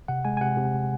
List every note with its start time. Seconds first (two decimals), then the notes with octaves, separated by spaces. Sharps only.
0.08 C3 F#5
0.25 G#3 G#5
0.37 G#5
0.41 C3 F#5
0.57 C3